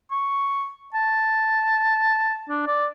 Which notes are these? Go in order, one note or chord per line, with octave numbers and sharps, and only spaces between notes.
C#6
A5
D4
D5